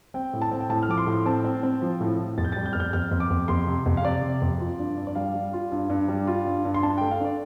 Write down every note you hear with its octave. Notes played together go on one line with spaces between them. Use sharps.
C4 G5
A2
A5
C4
G5
A2 A5
F6
F3 D6
C6
A2
C4 A5
C4
C4
F3
A2
A2
F2 A6
G6
G3 A6
G6
F2 F6
G6
F2 F6
F2
D6
F2
F2 C6
C3
F2
F5
C3 D5
C3
F2
F4
G2
G2
D5
G3 F5
G3
F4
G2
G2
G3
F4
G2
G2
C6
D4 A5
A3 G5
F5
D4 D5